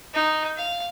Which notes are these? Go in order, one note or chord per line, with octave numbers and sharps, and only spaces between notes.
D#4
F5